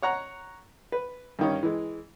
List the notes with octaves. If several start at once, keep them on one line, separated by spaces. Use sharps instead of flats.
C#5 F#5 A#5
B4
G2 D#3 C#4
E3 G#3